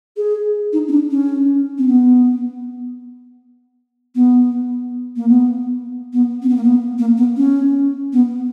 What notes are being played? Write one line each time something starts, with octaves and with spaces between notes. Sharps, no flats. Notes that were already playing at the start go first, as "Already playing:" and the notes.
G#4
D#4
C#4
D4
C#4
C4
B3
B3
A#3
B3
B3
C4
B3
A#3
B3
A#3
B3
C#4
B3